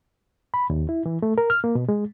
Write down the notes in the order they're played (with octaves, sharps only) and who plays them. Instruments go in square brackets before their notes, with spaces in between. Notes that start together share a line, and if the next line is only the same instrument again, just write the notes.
[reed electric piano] B5
D#2
E4
E3
A3
A#4
F6
A#3
B2
G#3